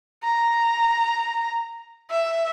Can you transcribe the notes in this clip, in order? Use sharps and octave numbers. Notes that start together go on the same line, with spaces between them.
A#5
E5